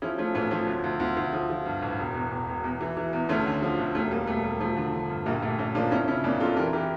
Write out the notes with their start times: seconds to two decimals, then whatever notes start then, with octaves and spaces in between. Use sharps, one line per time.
0.02 F3 C#4 E4
0.18 F3 A3 C#4
0.34 A1 A3 C#4
0.51 F3 A3 C#4
0.67 D2
0.84 D2
1.00 D2
1.17 D2
1.33 F3
1.50 F3
1.66 G2
1.82 A1
1.98 E1
2.15 E2
2.31 E1
2.47 E1
2.64 E2
2.81 E3
2.97 E3
3.13 E2
3.29 D2 A3 C#4
3.46 D3
3.62 F3
3.79 D2
3.95 E1 A3 C#4
4.11 E1 G3 A#3
4.27 E1 A3
4.44 E1 G3
4.60 F3 A3
4.76 D3
4.93 D3
5.10 G2
5.26 A#1 G3 A#3
5.42 A#1 A3
5.58 A#1 A3 C#4
5.75 F3 A#3 D4
5.91 F2 C#4 E4
6.08 C#3 C#4 E4
6.24 F2 A#3 D4
6.40 F2 F4 A4
6.57 E3 G4 A#4
6.73 E3 G4 A#4